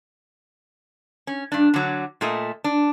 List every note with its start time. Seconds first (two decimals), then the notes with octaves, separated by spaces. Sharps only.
1.27 C#4
1.52 G2 D4
1.74 D3 F#3
2.21 A#2 A3 D#5
2.64 D4